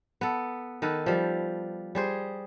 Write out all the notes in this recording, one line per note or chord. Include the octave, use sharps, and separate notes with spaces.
B3 A4
D#3 A4 B4
F3 G3
G3 G#4 C5